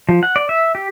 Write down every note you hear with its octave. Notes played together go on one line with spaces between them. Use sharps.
F3
F#5
D5
E5
G4